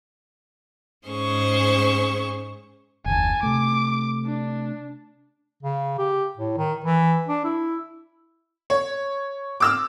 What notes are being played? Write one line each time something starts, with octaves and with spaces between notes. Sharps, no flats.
G#2 C#4 G#4 C5 C#6
F#1 D#2 G#5 A5
C3 A3 D6
D4
C#3
G4
A2
D#3
E3
D4
E4
C#5
D6 E6 F6